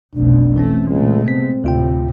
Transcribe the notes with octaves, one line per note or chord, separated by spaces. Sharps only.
F1 B1 B2 D4
E3 A3 C4 C#4
C#2 A#2 G#3 A3
C3 B3 C4 B6
D2 A2 C3 F4 G5